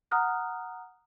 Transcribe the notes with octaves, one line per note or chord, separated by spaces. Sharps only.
F#5 A#5 D#6 F6 F#6